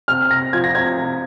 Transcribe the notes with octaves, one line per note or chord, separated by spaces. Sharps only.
C3 F6
C3 A#6
F3 G#6
A#6
C3 G#6
C3